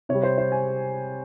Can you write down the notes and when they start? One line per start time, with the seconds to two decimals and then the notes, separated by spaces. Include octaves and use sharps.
0.09 C3 G3 C#5
0.23 C5
0.38 C5
0.52 G#5